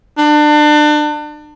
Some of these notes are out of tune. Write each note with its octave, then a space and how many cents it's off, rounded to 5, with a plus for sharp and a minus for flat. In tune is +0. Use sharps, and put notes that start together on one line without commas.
D4 +30